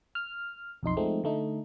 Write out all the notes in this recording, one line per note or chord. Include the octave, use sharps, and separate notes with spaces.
F6
B1 F2 D#4 C6
F3 G#3 A3 C4 D#4
D3 A3 D#4